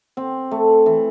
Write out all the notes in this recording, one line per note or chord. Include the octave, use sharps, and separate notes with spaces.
C4
A3
E3